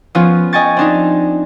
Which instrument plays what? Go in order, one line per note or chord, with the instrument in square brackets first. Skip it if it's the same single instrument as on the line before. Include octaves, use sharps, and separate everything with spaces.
[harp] F3 B3 C#4 F4
D#5 G5 G#5 C#6 A6
C4 D4 D#4